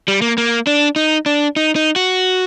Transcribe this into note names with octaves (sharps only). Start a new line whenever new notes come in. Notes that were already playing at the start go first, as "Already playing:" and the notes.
G3
A#3
A#3
D4
D#4
D4
D#4
D#4
F#4